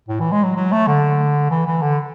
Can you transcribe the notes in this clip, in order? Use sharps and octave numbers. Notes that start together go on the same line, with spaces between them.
A2
E3
G#3
F#3
F#3
A3
D3
E3
E3
D3